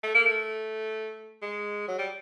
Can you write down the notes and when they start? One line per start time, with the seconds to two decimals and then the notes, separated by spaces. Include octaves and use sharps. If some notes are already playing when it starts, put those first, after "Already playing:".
0.03 A3
0.14 A#3
0.26 A3
1.42 G#3
1.88 F#3
1.98 G3